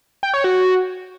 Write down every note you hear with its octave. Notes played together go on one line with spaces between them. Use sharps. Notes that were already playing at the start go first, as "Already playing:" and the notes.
G5
C#5
F#4